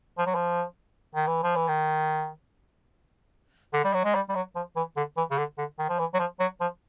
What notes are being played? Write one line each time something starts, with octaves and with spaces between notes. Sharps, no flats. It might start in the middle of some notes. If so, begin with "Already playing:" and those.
F3
F#3
F3
D#3
E3
F3
E3
D#3
D3
G3
F#3
G#3
G3
G3
F#3
F3
E3
D3
E3
C#3
D3
D3
D#3
F3
E3
F#3
F3
F#3
F3